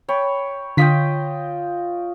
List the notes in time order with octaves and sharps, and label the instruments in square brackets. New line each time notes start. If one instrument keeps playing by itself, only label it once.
[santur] C#5 G5 B5
[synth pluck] D3 B6 [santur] F4 D#5 G5